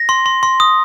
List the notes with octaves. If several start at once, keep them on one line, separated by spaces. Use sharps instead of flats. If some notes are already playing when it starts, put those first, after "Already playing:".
Already playing: A#6
C6
C6
C6
D#6